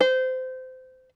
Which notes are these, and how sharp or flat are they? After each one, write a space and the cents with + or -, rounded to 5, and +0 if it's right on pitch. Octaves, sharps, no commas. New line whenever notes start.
C5 -25